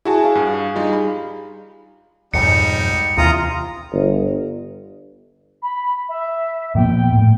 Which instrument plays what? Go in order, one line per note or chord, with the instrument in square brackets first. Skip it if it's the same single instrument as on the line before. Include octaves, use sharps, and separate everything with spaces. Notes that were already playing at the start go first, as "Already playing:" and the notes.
[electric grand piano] E4 F#4 A5 [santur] G#4
[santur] F5
[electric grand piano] G2
G3 D#4 F4
B5
[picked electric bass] B1 F2 G#2 [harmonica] G3 D#4 [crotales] C#7
[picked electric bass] D#2 C3 E3 [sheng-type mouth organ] F4 A#5 D#6
[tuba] G1
[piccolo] B5
E5
[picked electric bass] A#2 F3 B3 [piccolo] G5
[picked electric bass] A2